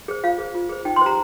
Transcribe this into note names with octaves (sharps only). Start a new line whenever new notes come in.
G#4 C5
F4 F5
G#4 C5
F4
G#4 C5
D#4 G5
C6
G4 C5 A#5